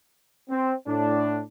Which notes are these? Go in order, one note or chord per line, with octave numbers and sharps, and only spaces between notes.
C4
A2 D4